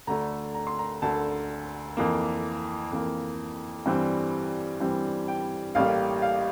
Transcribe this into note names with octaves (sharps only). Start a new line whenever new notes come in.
D2 D3 A3 A#5
A#5
C6
A#5
D2 D3 A3 A5
F2 E3 A#3
F2 E3 A#3
G2 E3 G3 C4
G2 E3 G3 C4
G5
A1 A2 G3 A#3 F5
F5